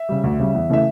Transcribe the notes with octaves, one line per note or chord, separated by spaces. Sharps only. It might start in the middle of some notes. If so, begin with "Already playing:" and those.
Already playing: E5
C#3 G3
D2
C#3 G3
E2
C#3 E3 A3 E5